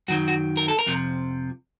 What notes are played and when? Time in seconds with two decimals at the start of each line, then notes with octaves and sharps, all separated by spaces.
0.08 F#2 D#3 F#3 F#4
0.28 F#4
0.57 A#4
0.68 A4
0.79 A#4
0.86 F2 C3 F3